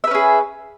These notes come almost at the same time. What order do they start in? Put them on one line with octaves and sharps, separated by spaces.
E5 B4 C#4 G#4